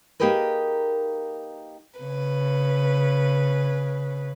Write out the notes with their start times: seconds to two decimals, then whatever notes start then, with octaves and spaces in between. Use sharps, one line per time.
0.20 A#3 D#4 G4 G#4 A#4 B4
2.00 C#3 B4